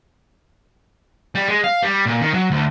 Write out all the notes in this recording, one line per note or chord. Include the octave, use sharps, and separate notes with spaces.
G3
G#3
F5
G3
A#2
D#3
F#3
D2